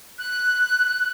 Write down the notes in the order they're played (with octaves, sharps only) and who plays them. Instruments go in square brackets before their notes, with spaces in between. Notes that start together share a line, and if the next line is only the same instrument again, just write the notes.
[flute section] F#6